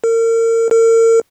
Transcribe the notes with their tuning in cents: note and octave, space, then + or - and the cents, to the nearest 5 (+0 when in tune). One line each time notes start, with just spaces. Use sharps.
A#4 -35
A#4 -40